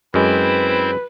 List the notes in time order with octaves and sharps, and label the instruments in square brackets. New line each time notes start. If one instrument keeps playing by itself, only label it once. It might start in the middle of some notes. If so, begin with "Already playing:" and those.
[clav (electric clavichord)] F#2 G#3 [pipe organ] C4 E4 C5 [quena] B4